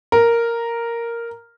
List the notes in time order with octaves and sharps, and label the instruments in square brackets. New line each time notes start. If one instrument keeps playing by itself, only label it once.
[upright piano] A#4